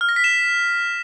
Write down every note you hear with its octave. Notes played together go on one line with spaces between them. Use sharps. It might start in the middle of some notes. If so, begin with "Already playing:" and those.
F6
A#6
B6
E7